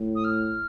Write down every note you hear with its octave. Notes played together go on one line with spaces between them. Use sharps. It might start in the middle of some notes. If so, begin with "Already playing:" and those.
Already playing: A2
D#6
F6